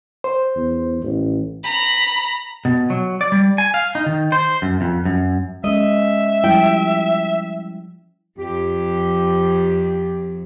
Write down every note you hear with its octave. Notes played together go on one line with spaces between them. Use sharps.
C5
E2
A1
A#5 B5
B2
F#3
D5
G3
G#5
F5
D#4
D#3
C5
F#2
F2
F#2
G#3 C#4 D#5 E5
F3 G3 E4 G5
F2 G4